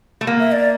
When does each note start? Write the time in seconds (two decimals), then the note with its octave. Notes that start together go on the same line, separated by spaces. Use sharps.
0.21 A3
0.27 A#3
0.40 E5
0.52 D5